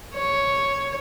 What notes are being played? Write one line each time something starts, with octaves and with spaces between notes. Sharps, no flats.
C#5